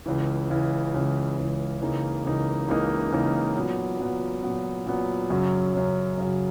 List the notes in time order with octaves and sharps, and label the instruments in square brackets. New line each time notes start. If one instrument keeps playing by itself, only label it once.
[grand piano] C#2 C#3 E3
C#2 C#3 E3
C#2 C#3 E3
C#2 C#3 E3
C#2 C#3 E3 A#3 D#4
C#2 C#3 E3 A#3 D#4
C#2 C#3 E3 A#3 D#4
C#2 C#3 E3 A#3 D#4
A#2 F#3 B3
A#2 F#3 B3
A#2 F#3 B3
A#2 F#3 B3
F#2 C#3 F#3
F#2 C#3 F#3
F#2 C#3 F#3